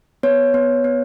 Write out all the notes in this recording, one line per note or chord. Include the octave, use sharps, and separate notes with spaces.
B3 C#5
B3
B3